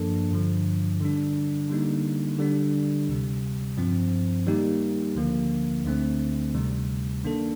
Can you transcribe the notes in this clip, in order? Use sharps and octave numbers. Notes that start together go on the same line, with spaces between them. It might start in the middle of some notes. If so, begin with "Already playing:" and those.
Already playing: G2 F3 A#3 D4 A4
G2 D3 F3
D3 G3 D4
D3 G3 A#3 D#4
D3 G3 D4
D2 C3 G3
G2 F3 C4
D#3 G3 A#3 D#4 G4
D2 D3 F3 A#3
D2 D3 A3 C4
D2 C3 D#3 G3
D#3 A#3 D4 A4